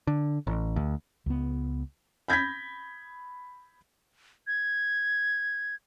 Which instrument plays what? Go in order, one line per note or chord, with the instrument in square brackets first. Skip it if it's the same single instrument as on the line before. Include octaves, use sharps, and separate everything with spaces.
[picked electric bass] D3
A1
D2
[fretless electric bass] C#2 B3
[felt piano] B5 G6 G#6 A#6 B6
[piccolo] G#6